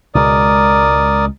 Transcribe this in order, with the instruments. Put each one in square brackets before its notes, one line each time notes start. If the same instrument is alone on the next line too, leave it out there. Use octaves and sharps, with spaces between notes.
[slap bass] C#2 B2 G#3 [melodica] A#4 D5 D#6